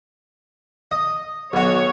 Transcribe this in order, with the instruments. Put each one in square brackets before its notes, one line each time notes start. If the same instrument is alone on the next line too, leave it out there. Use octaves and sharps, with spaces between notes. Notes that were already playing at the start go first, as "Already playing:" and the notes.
[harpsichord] D#5
[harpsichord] B1 F#4 [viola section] C#5